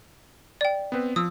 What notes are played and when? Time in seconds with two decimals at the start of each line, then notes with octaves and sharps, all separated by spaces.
0.61 D5 G5
0.92 B3 C4 B4
1.16 F3 D#6 E6